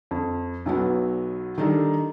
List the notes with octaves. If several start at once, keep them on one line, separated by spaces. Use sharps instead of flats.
F2
B1 F#3 B3
D#3 G3 D4 D#4 A4